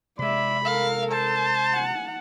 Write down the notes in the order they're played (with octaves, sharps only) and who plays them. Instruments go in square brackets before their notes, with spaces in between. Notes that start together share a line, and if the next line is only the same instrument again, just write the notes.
[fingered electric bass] C3 G#3 [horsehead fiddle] D5 E5 [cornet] B5
[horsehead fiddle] A4 A#4 [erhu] F5
[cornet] C5 [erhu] A5
[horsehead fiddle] F#5